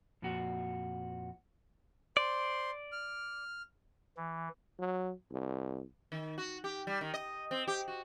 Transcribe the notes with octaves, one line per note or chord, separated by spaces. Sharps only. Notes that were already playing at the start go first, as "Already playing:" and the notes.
F2 A#2 F#4
C5 D5 C6
F6
E3
F#3
C2
D#3
F#4
G4
G3
D#3
D#5
C4
G4
F#4